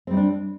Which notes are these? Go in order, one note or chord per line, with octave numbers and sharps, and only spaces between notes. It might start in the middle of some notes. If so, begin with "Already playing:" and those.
G3 C4 D4 D#4